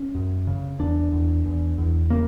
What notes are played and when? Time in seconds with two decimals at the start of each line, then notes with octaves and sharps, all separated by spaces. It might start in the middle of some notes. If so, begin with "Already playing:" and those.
Already playing: C#4
0.15 F#2
0.47 C#3
0.79 E2 D4
1.12 E2
1.46 E2
1.78 E2
2.10 C#3 A#3